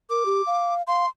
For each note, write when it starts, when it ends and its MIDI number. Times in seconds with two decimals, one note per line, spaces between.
0.10 0.24 70
0.10 0.74 86
0.26 0.42 67
0.47 0.82 77
0.87 1.04 77
0.87 1.08 84